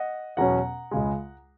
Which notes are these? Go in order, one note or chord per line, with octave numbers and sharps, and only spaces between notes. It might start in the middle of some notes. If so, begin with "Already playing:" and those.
Already playing: D#5 F#5
E2 B2 F#3 C#4 F#5 A#5
C#2 C#3 G#3